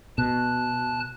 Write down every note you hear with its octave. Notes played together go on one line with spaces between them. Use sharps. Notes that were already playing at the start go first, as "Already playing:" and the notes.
B2 A5 F#6